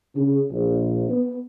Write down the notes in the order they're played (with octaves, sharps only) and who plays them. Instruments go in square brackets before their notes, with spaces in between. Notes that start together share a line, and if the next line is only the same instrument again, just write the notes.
[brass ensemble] C#3
A#1
B3